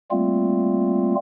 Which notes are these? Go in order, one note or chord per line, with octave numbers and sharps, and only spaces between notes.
G3 A3 A#3 C4 F4